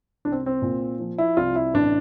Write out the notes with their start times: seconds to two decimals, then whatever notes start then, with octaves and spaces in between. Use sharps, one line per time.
0.25 C2 D4
0.32 C4
0.46 C4
0.62 A#2
1.00 F3
1.18 E4
1.37 C2 F4
1.55 E4
1.74 A1 D4